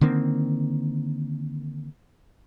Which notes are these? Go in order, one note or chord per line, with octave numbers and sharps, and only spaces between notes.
D3 D#3 A#3 C4